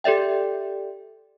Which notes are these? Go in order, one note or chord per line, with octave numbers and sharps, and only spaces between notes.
G4 A4 D5 E5 G5